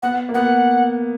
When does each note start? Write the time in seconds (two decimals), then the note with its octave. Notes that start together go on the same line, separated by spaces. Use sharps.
0.03 B3 F#5
0.29 A#3
0.34 B3 F#5